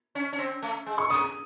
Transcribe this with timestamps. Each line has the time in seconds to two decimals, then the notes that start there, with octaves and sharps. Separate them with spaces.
0.15 C#4
0.33 C#4
0.38 C4
0.62 A3
0.86 G#3
0.98 C#6
1.10 C3 D#6